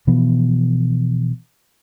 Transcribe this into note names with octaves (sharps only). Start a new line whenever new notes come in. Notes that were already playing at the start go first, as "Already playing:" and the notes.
B2 E3 F3 B3